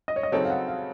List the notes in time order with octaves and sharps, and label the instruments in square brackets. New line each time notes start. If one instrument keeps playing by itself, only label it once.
[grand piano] D#5
C#5
D#5
[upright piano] C#3 F#3 C4 D#4 A4 [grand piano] C#5
[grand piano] F5
F#5
F5